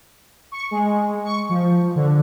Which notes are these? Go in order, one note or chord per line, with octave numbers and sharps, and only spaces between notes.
C#6
G#3
C#6
F3
D3